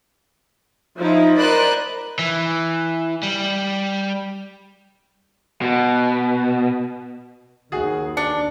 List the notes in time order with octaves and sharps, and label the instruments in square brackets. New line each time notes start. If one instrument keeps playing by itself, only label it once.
[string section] F3 D#4 E4
A#4 C5 D5 D#5 B5 F#6
[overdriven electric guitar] E3
G3
B2
[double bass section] D#2 [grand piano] F#4 G#4
[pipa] D4 [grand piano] C#7